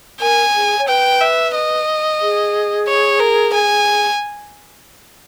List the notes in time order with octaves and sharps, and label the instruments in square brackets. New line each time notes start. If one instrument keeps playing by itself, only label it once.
[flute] A#4 [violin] G#5
[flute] G#4
C#5
[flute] B4 [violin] G5
[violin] E5
D#5
[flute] G#4
[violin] C#5
A#4
G#5